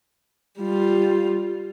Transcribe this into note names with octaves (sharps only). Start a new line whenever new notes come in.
G3 F4